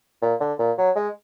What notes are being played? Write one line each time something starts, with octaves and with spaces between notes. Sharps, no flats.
A#2
D3
A#2
F#3
G#3